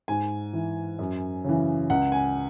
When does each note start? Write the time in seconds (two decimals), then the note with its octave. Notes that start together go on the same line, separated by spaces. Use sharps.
0.08 G#2 G#5
0.53 E3
0.99 F#2
1.44 C#3 E3
1.90 C#2 F#5
2.12 G#5